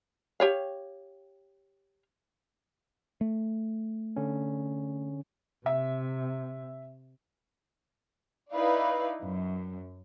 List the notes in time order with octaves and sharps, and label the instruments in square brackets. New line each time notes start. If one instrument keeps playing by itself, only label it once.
[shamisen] G4 C#5 F5
[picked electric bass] A3
[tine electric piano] D3 C#4
[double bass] C3 [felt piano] E5
[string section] D#4 E4 B4 D5 F5
F#2